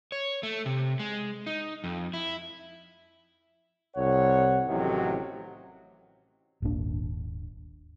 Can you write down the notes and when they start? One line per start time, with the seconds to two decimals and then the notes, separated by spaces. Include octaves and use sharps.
0.12 C#5
0.43 A3
0.66 C3
1.00 G#3
1.47 D#4
1.84 F2
2.14 E4
3.96 C2 C#5 F#5
4.69 A1 A2 C3 D#3 F#3
6.62 D#1 G#1 A#2 D4